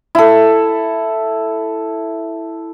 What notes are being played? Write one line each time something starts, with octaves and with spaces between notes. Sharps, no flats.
E4 A4